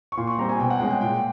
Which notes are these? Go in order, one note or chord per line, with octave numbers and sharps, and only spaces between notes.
C#6
A#2 C6
C#6
G3 C4 A#5
G#5
B2 G5
F#5
G#3 C#4 G5
G5
A#2 G5